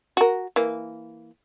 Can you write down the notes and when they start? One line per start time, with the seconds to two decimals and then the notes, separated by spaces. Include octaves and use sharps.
0.17 F#4 A#4
0.56 E3 A#3